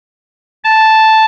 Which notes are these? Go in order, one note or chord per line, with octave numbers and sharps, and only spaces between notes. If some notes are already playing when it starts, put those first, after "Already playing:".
A5